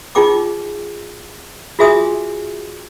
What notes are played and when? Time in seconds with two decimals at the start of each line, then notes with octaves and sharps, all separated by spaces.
0.15 D#4 F4 G#4 G5 C#6 D6
1.79 F4 F#4 G#4 E5 G#5 D#6